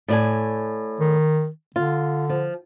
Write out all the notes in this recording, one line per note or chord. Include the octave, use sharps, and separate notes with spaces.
A2 D5 G#5
D#3
D3 F4
F3